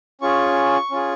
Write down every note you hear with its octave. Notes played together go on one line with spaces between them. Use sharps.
C#4 F4 G#4 C#6
C#4 F4 G#4